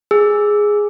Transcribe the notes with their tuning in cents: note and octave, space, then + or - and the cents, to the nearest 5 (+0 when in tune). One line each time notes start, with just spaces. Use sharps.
G#4 +0 E6 +0